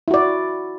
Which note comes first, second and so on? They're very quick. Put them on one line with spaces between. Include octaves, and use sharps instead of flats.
E4 F#4 D5